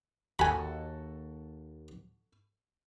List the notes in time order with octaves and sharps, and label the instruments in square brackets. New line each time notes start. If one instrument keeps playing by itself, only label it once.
[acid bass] D#2 [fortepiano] F#4 A4 [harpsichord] G#5 B5